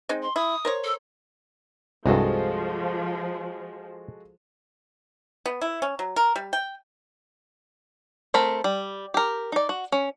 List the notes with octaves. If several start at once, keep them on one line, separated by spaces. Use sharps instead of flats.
G#3 C4 D#4
C6
E4 D#6
A#4 C5 C#5
A4
C2 G2 F3 G#3 F#4 A4
B3
E4
C#4
F#3
A#4
G3
G5
A3 C4 A#4 B5
G3
G4 A#4
D#4 D5
F#4
C#4